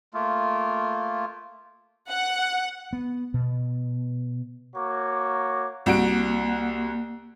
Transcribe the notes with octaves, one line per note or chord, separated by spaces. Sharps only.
A3 A#3 F4
F#5
B3
B2
A#3 F#4 C#5 D6
C2 A#3 F#4 D7